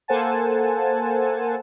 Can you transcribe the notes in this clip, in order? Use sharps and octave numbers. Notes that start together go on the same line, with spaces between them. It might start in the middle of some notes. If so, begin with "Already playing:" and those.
A#3 A4 C5 F#5 G#5 A5